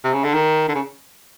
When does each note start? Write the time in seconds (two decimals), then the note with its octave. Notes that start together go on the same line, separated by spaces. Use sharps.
0.04 C3
0.14 C#3
0.24 D3
0.34 D#3
0.68 D3
0.75 C#3